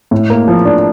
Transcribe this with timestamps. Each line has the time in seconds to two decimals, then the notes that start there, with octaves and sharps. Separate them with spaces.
0.11 A2
0.30 A#3
0.48 F3
0.65 D4